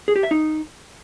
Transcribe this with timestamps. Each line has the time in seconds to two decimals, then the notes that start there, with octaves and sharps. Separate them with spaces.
0.08 G#4
0.16 G4
0.23 E5
0.31 D#4